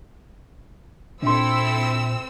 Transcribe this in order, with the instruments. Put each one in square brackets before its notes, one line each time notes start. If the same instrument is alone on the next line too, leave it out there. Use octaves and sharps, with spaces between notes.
[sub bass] A#2 [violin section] C4 E6 [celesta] D4 C6 [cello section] E4 A4 E5